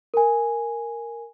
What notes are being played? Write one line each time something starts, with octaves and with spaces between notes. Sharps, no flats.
A#4 G#5